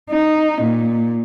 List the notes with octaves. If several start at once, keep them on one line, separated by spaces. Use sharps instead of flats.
D#4
A#2